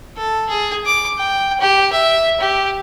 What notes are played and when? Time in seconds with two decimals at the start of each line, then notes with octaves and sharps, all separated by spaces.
0.17 A4
0.49 G#4
0.86 D6
1.18 G5
1.61 G4
1.93 E5
2.41 G4